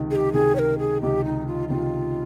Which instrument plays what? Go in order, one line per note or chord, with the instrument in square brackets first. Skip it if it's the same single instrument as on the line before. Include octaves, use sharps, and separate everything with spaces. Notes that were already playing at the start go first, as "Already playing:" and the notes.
Already playing: [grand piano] C#2 C3 D#3
[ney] G#4
G4
[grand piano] C#2 C3 D#3 [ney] G#4
[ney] C#5
A#4
G#4
[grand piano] C#2 C3 D#3 [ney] G4
[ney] D#4
F4
[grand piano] C#2 C3 D#3 [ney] F4